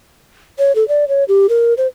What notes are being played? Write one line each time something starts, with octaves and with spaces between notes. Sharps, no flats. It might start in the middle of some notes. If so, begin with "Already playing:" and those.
C#5
A4
D5
C#5
G4
A#4
C5